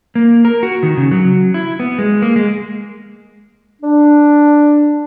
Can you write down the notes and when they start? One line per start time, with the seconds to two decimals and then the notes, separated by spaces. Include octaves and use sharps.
0.15 A#3
0.45 A#4
0.63 F#4
0.83 D#3
0.97 C#3
1.12 F#3
1.54 E4
1.80 B3
1.98 G#3
2.22 A#3
2.36 G#3
3.82 D4